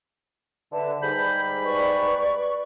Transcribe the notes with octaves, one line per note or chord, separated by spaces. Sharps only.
D3 B4 E5 A5
G#2 G3 B5 G6
B4 D5 C#6